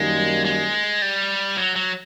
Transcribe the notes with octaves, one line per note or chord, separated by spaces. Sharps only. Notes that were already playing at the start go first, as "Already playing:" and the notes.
Already playing: F#2 D#3 G3 G#3 A#3
G#3
G3
F#3
F#3